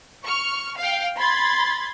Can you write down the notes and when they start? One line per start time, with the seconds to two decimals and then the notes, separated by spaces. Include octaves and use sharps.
0.23 C#6 F6
0.77 F5 G5
1.18 B5 C6 G#6 A6